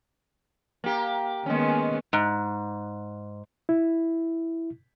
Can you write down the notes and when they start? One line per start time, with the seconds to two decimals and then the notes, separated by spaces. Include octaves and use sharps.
0.84 A#3 G4
1.46 D#3 G#3 A#3 B3 C#4
2.13 G#2
3.69 E4